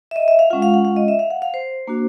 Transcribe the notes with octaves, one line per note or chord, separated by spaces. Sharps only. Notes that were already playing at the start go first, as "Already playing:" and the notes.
E5
D#5
E5
F5
G#3 C#4 F4 F#5
F5
F#5
F5
D#5
E5
F5
F#5
F5
C5
A#3 D4 F#4